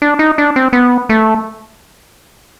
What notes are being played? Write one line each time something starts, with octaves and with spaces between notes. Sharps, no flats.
D4
D#4
D4
C4
B3
A3